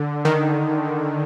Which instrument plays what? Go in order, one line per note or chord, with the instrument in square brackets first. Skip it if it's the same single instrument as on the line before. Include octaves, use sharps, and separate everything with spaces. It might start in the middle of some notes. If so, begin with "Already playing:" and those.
Already playing: [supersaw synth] D3
D#3